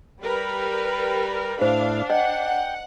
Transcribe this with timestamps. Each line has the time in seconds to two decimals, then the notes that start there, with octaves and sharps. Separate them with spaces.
0.22 G3 A#4 B4 B5
1.61 A2 D4 E4 C5 F5
2.10 D#5 F#5 G5